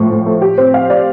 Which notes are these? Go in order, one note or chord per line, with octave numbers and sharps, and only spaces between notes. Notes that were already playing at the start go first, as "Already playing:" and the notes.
Already playing: A2 F3
A2
A3
G4
C4
F5
D5